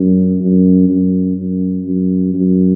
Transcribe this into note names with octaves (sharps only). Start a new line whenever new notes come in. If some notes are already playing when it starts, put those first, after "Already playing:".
Already playing: F#2
F#2
F#2
F#2
F#2
F#2